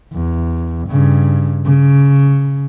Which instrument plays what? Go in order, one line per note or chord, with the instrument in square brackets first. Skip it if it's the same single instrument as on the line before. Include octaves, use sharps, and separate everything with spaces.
[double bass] E2
G2 C#3
C#3